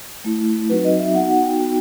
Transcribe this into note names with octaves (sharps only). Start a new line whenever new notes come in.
A3 E4
F#3 C4 D#4 F#4 B4
D#5
E5
B3 D#4 F#4 F#5
F#5
G5
B3 D#4 F#4 G5